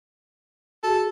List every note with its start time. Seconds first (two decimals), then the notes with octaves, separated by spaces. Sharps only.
0.83 F#4 G#4 A4